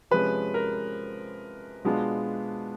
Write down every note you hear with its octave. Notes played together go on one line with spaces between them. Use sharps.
C3 F3 G#3 C#4 B4
A#4
B2 G#3 B3 D4 F4